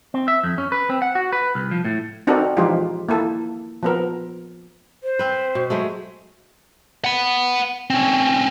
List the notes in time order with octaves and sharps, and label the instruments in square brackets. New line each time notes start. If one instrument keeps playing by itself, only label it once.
[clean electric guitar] C4
E5
F2
C#4
B4
C4
F#5
F#4
B4
C2
F3
A2
[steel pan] C4 D4 D#4 F#4 A4 A#4
E3 F3 G#3 D#4 F4 G4
A#3 E4 A4
F3 B3 A#4
[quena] C5
[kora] C4 B4
B2
F#3 G#3 A3
[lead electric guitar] F#5 B5
C4 C#4